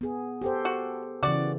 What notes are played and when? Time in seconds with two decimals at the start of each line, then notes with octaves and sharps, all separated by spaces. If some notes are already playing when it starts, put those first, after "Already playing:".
0.01 B3 G#4
0.42 G4 A4 C5
0.65 F#4
1.23 C#3 E3 F#4 D5